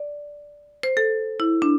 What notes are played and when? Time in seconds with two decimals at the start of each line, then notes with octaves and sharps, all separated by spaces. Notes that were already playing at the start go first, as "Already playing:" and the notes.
Already playing: D5
0.83 C5
0.97 A4
1.40 E4
1.62 D4